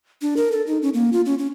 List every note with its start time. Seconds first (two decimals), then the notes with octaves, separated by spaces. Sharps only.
0.22 D4
0.37 A#4
0.52 A4
0.67 D#4
0.82 C#4
0.94 A#3
1.13 F4
1.26 C#4
1.39 C#4